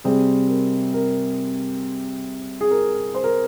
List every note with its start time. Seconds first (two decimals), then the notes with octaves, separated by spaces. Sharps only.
0.04 C3 G3 C4 G#4
0.49 A#4
0.94 A#4
2.61 G#4
2.71 A#4
3.15 C5
3.24 A#4